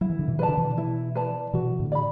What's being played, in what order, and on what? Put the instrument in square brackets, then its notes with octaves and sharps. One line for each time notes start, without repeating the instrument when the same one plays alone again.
[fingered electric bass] F#3 [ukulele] E4
[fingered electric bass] E3
D3
B2 E3
[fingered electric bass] E3 [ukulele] B4 D5 A5
[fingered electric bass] D3
B2 E3
[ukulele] E4
B4 D5 A5
[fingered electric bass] B2 E3 [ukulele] F#4
[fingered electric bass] A2 D3
[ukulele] D5 B5